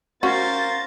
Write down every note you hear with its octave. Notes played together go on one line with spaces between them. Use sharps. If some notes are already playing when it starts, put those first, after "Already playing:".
C#4 F#4 A#4 C5 F5 A6